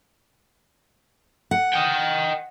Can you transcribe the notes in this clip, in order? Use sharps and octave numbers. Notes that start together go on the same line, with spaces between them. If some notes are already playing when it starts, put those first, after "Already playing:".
F#5
D#5 G5